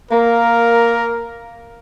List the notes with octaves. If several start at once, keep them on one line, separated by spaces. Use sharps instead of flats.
A#3 A#4